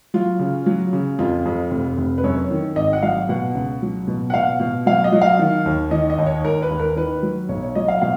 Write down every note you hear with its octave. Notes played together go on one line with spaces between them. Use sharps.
F#3 F4
C#3
F#3
C#3
F2 F4
F2
F1
F1
B4
F#2 C#5
D#3
G#1 D#5
F#5
F#3 F5
B2 F#5
C#2
F#3
B2
F#5
B2 F5
B2
F#3 F5
D#5
F#3
F5
D#3
D#2
D#3 D#5
D#5
D#2
C#5
D#2 A#4
B4
D#2
A#4
D#3 B4
F#3
B1 C#5
C#5
F#3 D#5
F5
B2 F5